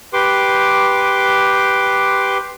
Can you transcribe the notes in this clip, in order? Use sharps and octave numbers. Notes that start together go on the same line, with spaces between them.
G4 B4 C6 D6